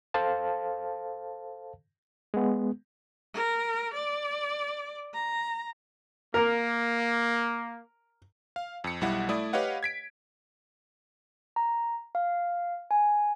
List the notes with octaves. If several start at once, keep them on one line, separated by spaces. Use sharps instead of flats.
A4 C5 F5 A5
G#3 B3
A#4
D5
A#5
A#3 A#4
F5
F2 C#7
B1 G3 E4 F#5
A3 E4 D5 D#6
G4 B4 C#5 D#5 F5 F#5
G#6 B6 D7
A#5
F5
G#5